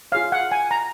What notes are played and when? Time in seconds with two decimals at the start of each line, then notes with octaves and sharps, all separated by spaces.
0.12 F4 G#4 C#5 F5
0.32 F#5
0.52 G#5
0.71 A#5